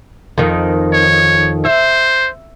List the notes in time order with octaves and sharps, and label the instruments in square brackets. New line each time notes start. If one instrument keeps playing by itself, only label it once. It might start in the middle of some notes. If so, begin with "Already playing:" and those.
[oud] F2 D#3
[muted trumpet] C#5
[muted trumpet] C5 [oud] E5